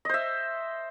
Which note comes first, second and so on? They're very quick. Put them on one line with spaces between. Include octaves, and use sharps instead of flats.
D#5 C5 E5